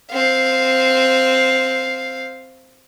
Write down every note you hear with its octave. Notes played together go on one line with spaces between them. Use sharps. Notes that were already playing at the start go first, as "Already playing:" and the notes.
C4 F5